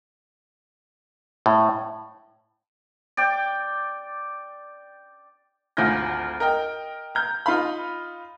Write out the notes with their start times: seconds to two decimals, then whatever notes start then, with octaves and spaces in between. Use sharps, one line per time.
1.46 A2
3.17 D5 G5
5.77 G#1 D2 F4 G#5 G6 A#6
6.40 A#4 D#5 G5
7.15 A#5 G6
7.46 D#4 F4 F5 B5